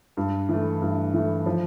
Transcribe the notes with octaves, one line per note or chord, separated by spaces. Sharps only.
G2
E3 A3
G2
E3 A3
F3